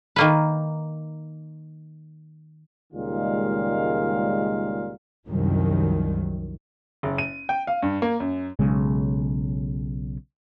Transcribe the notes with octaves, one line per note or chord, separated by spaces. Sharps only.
D#3 A#3 B4
C#2 A#2 D#3 G3 G#3 F5
C2 F#2 D#3 F3 F#3
F#1
D#7
G5
F5
G2
A#3
F#2
B1 C#3 G#3